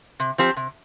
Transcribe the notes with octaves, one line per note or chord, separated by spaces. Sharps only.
C3
F3 C4 G4
C3